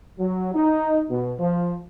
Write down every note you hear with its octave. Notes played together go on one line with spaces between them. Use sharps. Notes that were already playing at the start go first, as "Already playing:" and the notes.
F#3
D#4
B2
F3